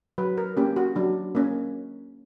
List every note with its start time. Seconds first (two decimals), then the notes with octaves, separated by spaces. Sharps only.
0.18 F#3 B4
0.38 A#4
0.57 A#3 C#4 G4
0.76 F#4
0.96 F#3 D4
1.35 A#3 C#4